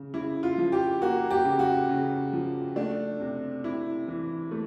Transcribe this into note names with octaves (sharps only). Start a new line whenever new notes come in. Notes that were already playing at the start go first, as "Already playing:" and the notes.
Already playing: C#3
C#3 E4
F4
F3
G4
A#3 F#4
G4
C#3
F#4
C#3
F3
A3 D4
C3
C3 E4
E3
A3